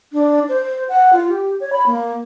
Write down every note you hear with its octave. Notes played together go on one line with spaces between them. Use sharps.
D4
C5
F#5
F4
G4
C#5
B5
A#3